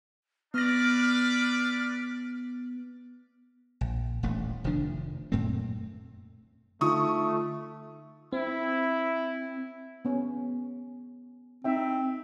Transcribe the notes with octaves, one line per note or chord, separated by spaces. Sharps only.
B3 D4 B4 D5 F6 A#6
A#1
D#1 A1 A3
F1 D#3 F3 D4
F#2 A#2 A3 C4
D3 A3 D#4 F4 C#6 D#6
C4 E4
B3 C#4
C4 D#4 E5 G5